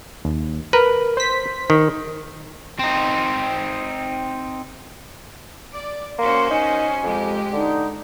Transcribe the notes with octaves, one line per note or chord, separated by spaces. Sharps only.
D#2
A#4 B4
C5 B6
D#3
C4 D#4
D5
A#3 C#4 F#4 C5 C6
D#4 G#5
F2 G#3 G4
D3 D#4